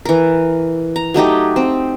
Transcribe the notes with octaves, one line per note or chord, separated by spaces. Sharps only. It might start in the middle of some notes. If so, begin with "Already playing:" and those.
E3 A#4
A#5
F#3 A3 D#4 G4
C4